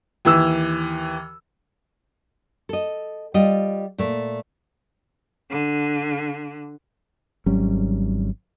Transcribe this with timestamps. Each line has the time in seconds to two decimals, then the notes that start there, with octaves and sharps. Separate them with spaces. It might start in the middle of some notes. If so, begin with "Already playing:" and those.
0.25 D#2 E3 E6
2.69 A4 D#5
3.34 G3 F4 D#5
3.98 A#2 A3
5.50 D3
7.46 G#1 F#3 G3 C#4